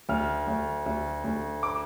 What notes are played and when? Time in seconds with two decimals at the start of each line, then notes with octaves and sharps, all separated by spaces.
0.09 D2 F6
0.48 D2
0.86 D2
1.24 D2
1.63 D6